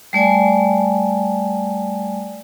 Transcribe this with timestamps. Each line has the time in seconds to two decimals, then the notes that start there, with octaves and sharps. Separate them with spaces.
0.13 G3 A3 D5 G#5